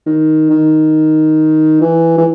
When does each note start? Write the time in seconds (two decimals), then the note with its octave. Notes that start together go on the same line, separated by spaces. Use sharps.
0.06 D#3
0.50 D#3
1.81 E3
2.18 E3